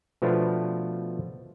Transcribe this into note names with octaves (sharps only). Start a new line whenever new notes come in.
B2 F3 A3 B3 D4 F4